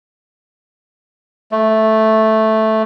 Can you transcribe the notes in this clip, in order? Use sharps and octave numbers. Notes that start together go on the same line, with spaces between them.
A3